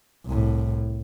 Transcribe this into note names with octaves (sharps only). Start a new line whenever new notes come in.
C2 A2